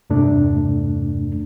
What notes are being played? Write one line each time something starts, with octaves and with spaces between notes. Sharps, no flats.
E2 G2 C3 A3 D4